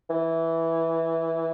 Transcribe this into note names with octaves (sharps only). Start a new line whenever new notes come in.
E3